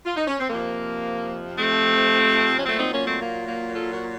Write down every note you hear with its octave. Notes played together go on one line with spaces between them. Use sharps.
F4
D#4
C#4
C4
F2 C3 F3 A#3
A3 C4
C#4
A#2 F#3 A3 C4
C4 D#4
A#3 C#4
A3 C4
A#3
A#3
F4 A4
F#4 A#4